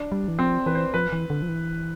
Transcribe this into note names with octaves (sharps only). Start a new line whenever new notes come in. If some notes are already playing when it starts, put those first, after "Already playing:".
Already playing: D4
G3
E3
F3 C4
E3 B4
C5
F3 B4
E3
D3
F3
E3